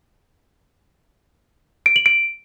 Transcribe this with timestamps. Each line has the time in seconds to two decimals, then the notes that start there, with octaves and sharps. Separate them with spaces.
1.86 D7
1.96 F#7
2.06 D7